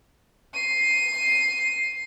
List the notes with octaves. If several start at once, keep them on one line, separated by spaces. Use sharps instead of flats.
C7 D#7